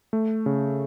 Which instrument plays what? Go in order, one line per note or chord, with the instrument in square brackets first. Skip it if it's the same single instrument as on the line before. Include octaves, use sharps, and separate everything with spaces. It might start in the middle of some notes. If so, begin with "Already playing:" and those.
[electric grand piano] A3
C#3